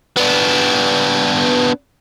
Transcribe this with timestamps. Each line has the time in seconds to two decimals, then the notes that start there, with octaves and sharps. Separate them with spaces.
0.17 B3 D4